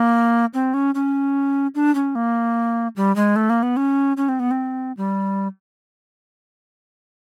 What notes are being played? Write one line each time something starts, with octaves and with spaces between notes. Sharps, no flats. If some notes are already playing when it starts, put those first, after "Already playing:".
Already playing: A#3
C4
C#4
C#4
D4
C#4
A#3
G3
G#3
A3
A#3
B3
C#4
C#4
C4
B3
C4
G3